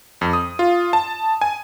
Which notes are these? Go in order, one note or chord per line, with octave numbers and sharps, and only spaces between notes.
F2
D#6
F4
A5
G#5